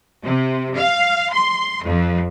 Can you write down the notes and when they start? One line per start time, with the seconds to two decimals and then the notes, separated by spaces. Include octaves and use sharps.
0.23 C3
0.77 F5
1.32 C6
1.84 F2